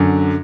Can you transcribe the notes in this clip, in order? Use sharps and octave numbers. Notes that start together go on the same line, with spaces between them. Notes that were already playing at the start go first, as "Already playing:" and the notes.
Already playing: F#2 D3